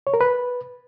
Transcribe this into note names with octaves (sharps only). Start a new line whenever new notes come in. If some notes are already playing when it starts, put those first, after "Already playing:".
C#5
A#4
B4